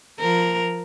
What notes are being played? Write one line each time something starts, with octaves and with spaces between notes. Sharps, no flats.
F3 A#4